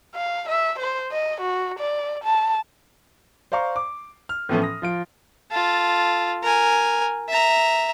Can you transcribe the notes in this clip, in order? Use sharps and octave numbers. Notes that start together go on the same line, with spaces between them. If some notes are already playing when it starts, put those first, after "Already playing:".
F5
E5
C5
D#5
F#4
D5
A5
C5 D5 F5 A#5 C#6
D6
F6
A2 E3 F3 B3 C#4 A4
D#6 A#6
F3 F4 D7
F4 A4
A#4 G#5
E5 A#5